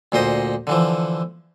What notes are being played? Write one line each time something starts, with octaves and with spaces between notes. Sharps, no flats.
D2 A#2 C5 D#5
D3 E3 F3